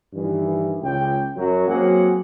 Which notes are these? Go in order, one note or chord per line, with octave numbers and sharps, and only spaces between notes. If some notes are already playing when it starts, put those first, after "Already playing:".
G2 D#3 E3
C#2 G5
F#2 F#3
F#3 A#3 C4 G#4 F#5